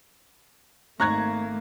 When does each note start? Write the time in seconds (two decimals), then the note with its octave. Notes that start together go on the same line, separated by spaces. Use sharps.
1.00 G#1 A3 A#3 A#5 C#6 F#6 G#6